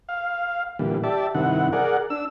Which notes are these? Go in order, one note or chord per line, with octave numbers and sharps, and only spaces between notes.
F5
A#2 D3 E3 G3
G4 D5 E5 A5
G2 C3 D#3 E4 F#5
G#4 A#4 D5 F#5
D4 E6